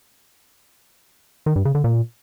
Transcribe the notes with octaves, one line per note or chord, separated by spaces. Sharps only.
D#3
G2
C#3
D3
A#2